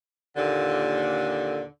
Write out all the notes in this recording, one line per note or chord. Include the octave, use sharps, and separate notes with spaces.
D#2 A#2 D3